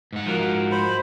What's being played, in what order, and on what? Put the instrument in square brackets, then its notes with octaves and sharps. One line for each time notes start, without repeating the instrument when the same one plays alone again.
[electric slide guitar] G#2 F#5
[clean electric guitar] F3 F#4 A#4
[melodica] C5 B5